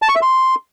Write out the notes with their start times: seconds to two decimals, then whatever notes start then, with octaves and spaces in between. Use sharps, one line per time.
0.02 A5
0.09 C#6
0.15 E5
0.22 C6